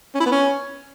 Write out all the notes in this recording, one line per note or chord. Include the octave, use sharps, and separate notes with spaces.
C#4
E4
B3
C#4